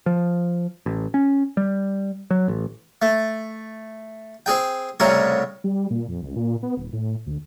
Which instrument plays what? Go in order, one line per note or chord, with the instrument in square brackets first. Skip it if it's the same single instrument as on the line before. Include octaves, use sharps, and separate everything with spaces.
[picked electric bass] F3
A1
C#4
G3
F#3
A1
[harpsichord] A3
C4 G#4 G5
C2 A2 C#3 A#4 C#5
[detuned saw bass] G3
A#2
F2
C#2
A#2
B3
D#1
A2
D2